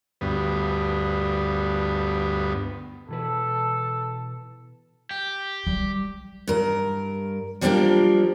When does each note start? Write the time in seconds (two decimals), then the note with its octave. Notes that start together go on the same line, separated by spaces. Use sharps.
0.21 D2 G2 B3
3.08 B2 E3 A4 B4
5.11 G4
5.67 G3
6.47 G2 A#4
7.61 F3 G3 A#3 D4 F4 A#4